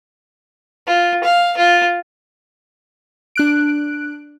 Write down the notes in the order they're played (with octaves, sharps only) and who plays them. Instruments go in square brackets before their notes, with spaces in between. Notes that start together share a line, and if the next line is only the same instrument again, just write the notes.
[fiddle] F4
F5
F4
[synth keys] D4 F#6 D7